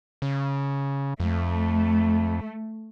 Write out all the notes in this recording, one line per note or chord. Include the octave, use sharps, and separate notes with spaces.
C#3
F2 A3